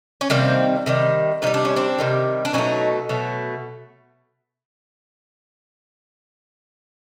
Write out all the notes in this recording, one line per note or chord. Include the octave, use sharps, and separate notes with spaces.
C#4
C3 D#3 G3 A#3 C4
C3 D#3 G3
C3 D#3 G3 D#4
D4
C#4
C4 D4
C3 D#3 G3
D4
B2 F#3 A3 C#4 D#4
B2 F#3 A3